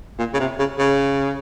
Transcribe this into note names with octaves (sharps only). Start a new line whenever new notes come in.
A#2
C#3
C3
C#3
C#3